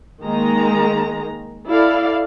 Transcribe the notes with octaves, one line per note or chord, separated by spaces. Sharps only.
D#3 G#3 A#3 A#5
E4 A4 D5 F5